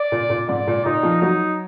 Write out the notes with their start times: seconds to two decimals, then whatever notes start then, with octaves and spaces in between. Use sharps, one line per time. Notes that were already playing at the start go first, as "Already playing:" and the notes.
Already playing: D5
0.12 A#2
0.30 A#2
0.48 G#2 D5
0.67 A#2
0.85 A#2 D#4
1.03 F3
1.21 F#3 D#4